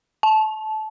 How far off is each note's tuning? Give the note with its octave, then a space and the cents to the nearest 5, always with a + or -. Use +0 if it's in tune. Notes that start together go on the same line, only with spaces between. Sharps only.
A5 -20